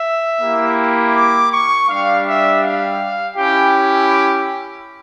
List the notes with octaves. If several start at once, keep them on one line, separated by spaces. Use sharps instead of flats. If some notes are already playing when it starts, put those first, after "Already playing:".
Already playing: E5
A#3 E4 G4
D6
C#6
G3 D4 G4 F5
E5
F5
C#4 E4 G4 G5